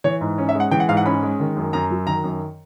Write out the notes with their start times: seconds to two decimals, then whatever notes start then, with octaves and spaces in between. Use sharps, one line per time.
0.04 E3 C#5
0.21 G#2
0.38 C#4
0.49 E5
0.55 G#3
0.60 F#5
0.71 E3 G5
0.80 F#5
0.89 G#2 F5
0.97 F#5
1.05 C#4 B5
1.23 G#3
1.40 D#3
1.56 F#2
1.73 F#2 A#5
1.90 F#3
2.07 D#3 A#5
2.24 F#2